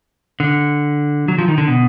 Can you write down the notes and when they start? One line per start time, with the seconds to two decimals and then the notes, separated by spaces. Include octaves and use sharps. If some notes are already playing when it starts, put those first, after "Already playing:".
0.40 D3
1.28 F#3
1.38 F3
1.48 D#3
1.58 D3
1.68 B2